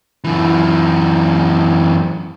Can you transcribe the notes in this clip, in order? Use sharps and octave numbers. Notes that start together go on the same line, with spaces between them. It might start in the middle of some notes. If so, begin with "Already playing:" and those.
F#2 E3